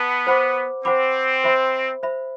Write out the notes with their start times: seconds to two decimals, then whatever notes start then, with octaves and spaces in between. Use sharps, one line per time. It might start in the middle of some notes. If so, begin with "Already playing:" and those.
Already playing: B3 B4 A5
0.27 C5 F#5 B5 D6
0.85 C4 C5 F#5 B5 D6
1.44 C5 E5 B5
2.03 C5 E5 B5